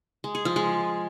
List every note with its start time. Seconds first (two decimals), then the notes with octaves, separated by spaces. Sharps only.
0.24 G#3
0.35 G#4
0.45 F3
0.56 G#3